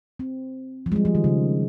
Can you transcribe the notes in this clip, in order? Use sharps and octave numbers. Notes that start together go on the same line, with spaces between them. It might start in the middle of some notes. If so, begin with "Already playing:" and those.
C4
F3
G#3
G3
F3
D#3
C#3